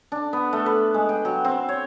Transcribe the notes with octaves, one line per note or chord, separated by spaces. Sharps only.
D4
B3
A3
B4
G#3
G5
F#3
C4
C#5